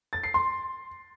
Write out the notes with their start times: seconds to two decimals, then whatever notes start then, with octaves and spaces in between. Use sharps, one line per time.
0.13 A6
0.23 C7
0.34 C6